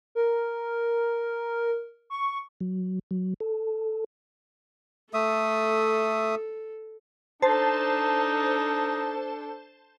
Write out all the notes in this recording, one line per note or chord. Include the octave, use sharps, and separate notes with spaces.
A#4
C#6
F#3
F#3
A4
A3 A4 E5 D#6
D4 D#4 A4 C5 A5